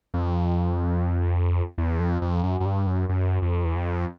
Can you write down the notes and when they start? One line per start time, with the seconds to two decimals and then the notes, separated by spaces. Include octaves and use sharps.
0.14 F2
1.78 E2
2.00 F2
2.22 F2
2.43 F#2
2.60 F#2
2.65 G2
2.87 F#2
3.09 F#2
3.42 F2
3.65 E2
3.76 F2